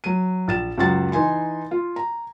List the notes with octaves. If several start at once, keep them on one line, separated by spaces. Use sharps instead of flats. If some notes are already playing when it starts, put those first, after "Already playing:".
F#3 D#7
A#1 A6 E7
C#2 F#2 F#4 A6
E3 D#4 G#5 C6
F4
A#5